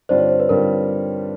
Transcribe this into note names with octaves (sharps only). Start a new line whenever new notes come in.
G2 D3 G3 C4 F4 C5 D5
C#5
C5
B4
G2 D3 G3 C4 F4 A#4